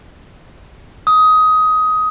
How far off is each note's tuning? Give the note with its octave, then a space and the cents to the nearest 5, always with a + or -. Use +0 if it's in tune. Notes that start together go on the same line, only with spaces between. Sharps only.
D#6 +15